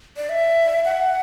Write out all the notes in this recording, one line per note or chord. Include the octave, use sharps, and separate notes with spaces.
D5
E5
F#5